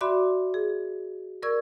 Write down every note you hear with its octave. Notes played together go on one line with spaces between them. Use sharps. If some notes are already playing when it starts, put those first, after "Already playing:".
F#4 D5 E5 B5 C6 D6
G#4
A#4 D5 C#6 E6 G#6